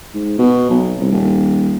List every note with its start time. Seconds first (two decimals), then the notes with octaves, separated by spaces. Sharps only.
0.14 G#2
0.39 B2
0.70 B1
1.00 C2
1.12 D#1